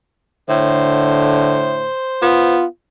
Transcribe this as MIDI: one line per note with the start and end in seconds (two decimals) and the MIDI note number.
0.49 1.90 45
0.49 1.95 50
0.49 2.54 72
2.22 2.64 59
2.22 2.65 65